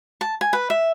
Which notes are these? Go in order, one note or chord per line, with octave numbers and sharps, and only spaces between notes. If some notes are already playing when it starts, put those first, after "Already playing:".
A5
G#5
B4
E5